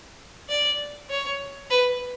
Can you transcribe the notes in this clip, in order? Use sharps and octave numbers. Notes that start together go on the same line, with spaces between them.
D5
C#5
B4